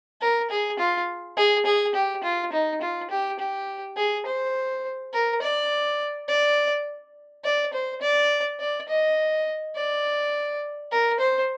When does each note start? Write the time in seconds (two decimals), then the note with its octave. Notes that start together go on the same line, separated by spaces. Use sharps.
0.21 A#4
0.50 G#4
0.79 F4
1.37 G#4
1.66 G#4
1.95 G4
2.23 F4
2.53 D#4
2.81 F4
3.10 G4
3.39 G4
3.97 G#4
4.26 C5
5.13 A#4
5.42 D5
6.28 D5
7.44 D5
7.73 C5
8.02 D5
8.60 D5
8.88 D#5
9.76 D5
10.91 A#4
11.20 C5